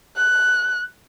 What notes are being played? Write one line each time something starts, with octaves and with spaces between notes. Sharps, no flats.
F#6